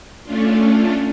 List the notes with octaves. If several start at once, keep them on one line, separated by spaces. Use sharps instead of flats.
A3 C#4 D4 F4